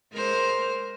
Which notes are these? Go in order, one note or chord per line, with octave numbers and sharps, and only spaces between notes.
G#3 A#4 C5